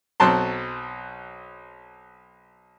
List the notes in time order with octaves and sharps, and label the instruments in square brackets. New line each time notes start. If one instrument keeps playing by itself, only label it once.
[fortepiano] B1 F#3 C4 A5 C6